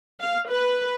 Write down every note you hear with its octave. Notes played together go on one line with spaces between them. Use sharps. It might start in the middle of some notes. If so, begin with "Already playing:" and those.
F5
B4